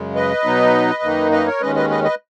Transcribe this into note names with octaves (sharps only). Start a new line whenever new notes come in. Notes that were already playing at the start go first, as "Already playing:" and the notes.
Already playing: F#2 C#3 G#3
B4 D#5
B2 F#3 B3 D#4
F#2 D#3 A#3 D#4
B4 D#5
A#4 C#5
D#2 D#3 G#3 C#4 B4 D#5
B4 D#5
B4 D#5
B4 D#5